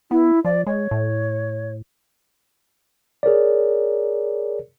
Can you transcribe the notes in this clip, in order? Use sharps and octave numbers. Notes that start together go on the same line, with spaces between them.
B3 E4
F3 D5
G#3 C#5
A2
G#4 A#4 C#5 D5